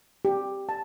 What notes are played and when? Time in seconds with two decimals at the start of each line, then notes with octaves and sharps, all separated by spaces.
0.25 G4
0.69 A5